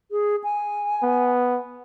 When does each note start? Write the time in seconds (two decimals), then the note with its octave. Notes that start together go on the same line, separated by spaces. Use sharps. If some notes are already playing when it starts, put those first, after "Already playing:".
0.11 G#4
0.43 G#5
1.03 B3